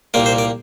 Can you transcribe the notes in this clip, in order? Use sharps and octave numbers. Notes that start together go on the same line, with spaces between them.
C2 A#2 G3 A#3 D5
C5
D5